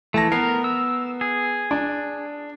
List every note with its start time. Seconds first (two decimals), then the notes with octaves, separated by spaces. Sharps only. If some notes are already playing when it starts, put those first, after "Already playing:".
0.14 E3 A3 A5 A#6
0.32 B3 A#4 B4 C7
0.64 E6
1.21 G#4
1.71 D4